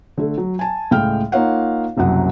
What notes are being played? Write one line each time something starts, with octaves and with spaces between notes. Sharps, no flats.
D3 A3
F#3
G#5 A5
C#2 A2 G#3 F5 G5 F6
A#3 D#4 F4 C#5 F5 F#5
F#1 C2 F#2 F#3 F#5